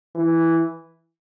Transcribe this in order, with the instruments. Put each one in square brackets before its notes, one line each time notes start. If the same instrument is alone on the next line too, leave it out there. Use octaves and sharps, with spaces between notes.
[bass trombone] E3